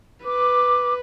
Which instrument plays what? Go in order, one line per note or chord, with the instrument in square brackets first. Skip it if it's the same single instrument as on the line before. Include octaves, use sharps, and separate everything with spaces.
[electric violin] B4 [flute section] D6